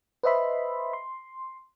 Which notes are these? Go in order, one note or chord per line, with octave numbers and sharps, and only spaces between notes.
B4 C5 D#5 E5 B5 C6
C6